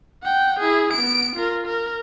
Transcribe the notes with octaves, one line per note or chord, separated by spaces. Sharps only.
F#5 G5
E4 G#4
B3 D7
F4 A#4
A#4